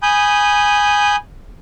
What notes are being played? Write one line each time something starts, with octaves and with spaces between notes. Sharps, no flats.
G#5 B5 D#6 G6